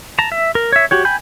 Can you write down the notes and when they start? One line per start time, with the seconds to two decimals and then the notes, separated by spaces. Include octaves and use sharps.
0.19 A5 A#5
0.32 E5
0.55 A#4
0.72 C#5 E5
0.91 F#4 G4 C#5
1.05 G5 G#5 B5 G6